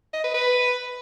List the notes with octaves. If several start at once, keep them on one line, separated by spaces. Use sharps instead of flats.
D#5
B4
B4